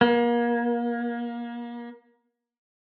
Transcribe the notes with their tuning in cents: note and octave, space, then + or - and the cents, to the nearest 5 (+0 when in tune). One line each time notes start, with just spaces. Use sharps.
A#3 +30